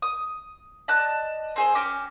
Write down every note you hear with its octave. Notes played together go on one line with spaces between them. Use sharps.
D#6
D5 D#5 A5 F#6
C4 G#4 C5
C#4 G5 A#5 D6